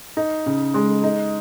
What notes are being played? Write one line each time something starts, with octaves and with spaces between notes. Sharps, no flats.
D#4
C#3
G#3
D#4